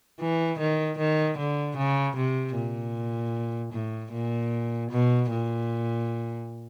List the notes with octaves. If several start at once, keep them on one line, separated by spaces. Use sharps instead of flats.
E3
D#3
D#3
D3
C#3
C3
A#2
A2
A#2
B2
A#2